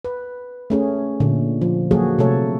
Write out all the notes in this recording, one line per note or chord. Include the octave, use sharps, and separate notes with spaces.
B4
A3 C#4 G#4
A#2 D3
F3
F#3 A#3 F#4 G#4 A4
C3 A3 A4 C#5